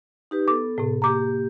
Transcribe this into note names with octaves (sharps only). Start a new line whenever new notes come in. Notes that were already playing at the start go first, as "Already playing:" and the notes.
D#4 G4 B4
B3 A4 D6
A2 C3
A#3 G4 A#5 D6